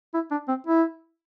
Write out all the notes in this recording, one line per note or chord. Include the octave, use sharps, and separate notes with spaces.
E4
D4
C4
E4